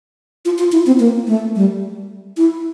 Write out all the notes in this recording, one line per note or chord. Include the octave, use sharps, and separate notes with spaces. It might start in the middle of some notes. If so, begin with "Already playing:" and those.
F4
F4
E4
C4
A#3
A3
G3
E4